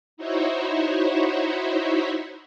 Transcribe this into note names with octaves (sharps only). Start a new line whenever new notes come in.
D#4 E4 F#4 C5 C#5 E5